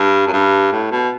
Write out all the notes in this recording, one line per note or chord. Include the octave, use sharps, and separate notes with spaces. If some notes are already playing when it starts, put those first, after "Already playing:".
Already playing: G2
F#2
G2
A2
B2